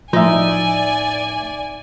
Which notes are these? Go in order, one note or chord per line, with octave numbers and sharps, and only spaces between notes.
A2 F3 D#4 D5 E5 G#5